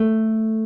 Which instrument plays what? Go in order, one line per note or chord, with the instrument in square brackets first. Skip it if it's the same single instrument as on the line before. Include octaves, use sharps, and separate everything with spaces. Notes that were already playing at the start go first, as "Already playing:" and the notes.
Already playing: [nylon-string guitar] A3